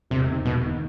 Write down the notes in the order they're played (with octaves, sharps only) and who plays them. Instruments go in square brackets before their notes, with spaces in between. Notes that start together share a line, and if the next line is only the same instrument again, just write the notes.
[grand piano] E1 [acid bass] C3
[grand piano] D#2 D#3
[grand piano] E1 [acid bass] B2
[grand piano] D#2 D#3